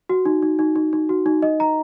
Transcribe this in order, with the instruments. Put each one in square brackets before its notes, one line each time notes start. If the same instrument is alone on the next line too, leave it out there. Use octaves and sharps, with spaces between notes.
[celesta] F#4
D#4
D#4
D#4
D#4
D#4
F#4
D#4
D#5
A#5